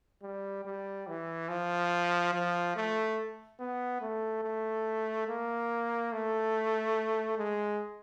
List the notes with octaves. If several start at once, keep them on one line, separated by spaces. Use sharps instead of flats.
G3
G3
E3
F3
F3
A3
B3
A3
A3
A#3
A3
G#3